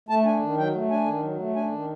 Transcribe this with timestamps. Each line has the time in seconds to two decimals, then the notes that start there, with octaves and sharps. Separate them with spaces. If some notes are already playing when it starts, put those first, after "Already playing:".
0.09 A3 A5
0.25 D4 G#5
0.42 D#3
0.58 F#3 G5
0.75 A3
0.90 D4 G#5
1.06 D#3
1.23 F#3
1.39 A3
1.55 D4 G#5
1.72 D#3